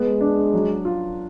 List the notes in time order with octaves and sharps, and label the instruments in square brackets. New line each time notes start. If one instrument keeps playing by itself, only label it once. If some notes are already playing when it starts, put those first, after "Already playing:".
Already playing: [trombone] G#3 [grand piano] B3
[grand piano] D4
F#3
F4